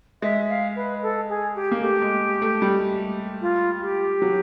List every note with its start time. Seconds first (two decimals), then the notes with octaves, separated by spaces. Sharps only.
0.22 G#3 E5
0.49 F5
0.76 B4
1.02 A4
1.29 G#4
1.55 G4
1.71 A#3
1.82 A3 G4
2.02 G#3
2.42 A3
2.62 G3
3.41 F4
3.81 G4
4.22 F#3